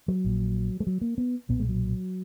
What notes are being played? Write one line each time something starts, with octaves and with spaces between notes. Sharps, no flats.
F#3
A#1 A#2
G#3
F#3
A#3
B3
B1 A#2 B3
G#3
F#3